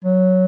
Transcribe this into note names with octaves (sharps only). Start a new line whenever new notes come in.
F#3